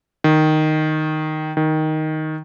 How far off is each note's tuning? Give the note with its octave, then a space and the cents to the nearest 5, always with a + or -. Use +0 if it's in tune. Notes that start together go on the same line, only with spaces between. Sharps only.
D#3 -5
D#3 +5